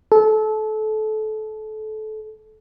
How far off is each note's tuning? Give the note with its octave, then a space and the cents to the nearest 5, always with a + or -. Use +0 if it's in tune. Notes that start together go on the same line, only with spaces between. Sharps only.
A4 -25